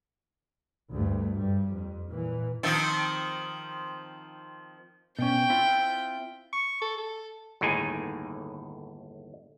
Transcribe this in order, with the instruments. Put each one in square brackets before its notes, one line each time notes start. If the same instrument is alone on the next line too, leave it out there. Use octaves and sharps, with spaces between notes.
[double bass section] D2 G2 A3
G2 G3
F2
A#2 E3
[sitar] D#3 F3 C4
[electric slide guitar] B2 C#4 [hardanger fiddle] G5
[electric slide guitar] C4 E4 F4
[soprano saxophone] C#6
A4
A4
[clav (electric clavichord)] G1 D#2 A2 D#4 G#4 G#5